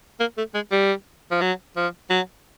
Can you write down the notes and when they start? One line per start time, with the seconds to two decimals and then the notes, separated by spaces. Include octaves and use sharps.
0.20 A#3
0.38 A3
0.55 G#3
0.72 G3
1.31 F3
1.42 F#3
1.77 F3
2.10 F#3